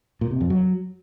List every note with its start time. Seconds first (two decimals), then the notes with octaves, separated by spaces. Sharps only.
0.21 A#2
0.31 C3
0.41 F2
0.50 F#3